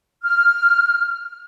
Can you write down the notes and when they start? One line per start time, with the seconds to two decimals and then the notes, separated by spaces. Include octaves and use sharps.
0.23 F6